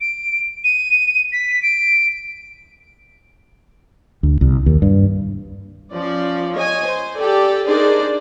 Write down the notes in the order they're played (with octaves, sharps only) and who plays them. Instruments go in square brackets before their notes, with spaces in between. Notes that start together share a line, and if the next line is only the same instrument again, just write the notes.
[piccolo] D7
D#7
B6
D7
[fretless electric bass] D2
C2
D#2
G2
[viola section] F3 C#4 D5
C#5 D#5 G#5
C5
G4 A4 D5
D4 D#4 G#4 A#4 C5 D5